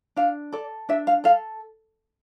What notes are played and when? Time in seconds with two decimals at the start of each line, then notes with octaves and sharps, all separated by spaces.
0.16 D4 F5
0.52 A4 D5
0.89 D4 E5
1.07 F5
1.24 A4 F5